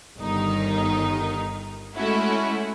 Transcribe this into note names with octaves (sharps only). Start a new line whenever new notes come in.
G1 D#3 D#4
G#3 A3 C#4 E4 F#4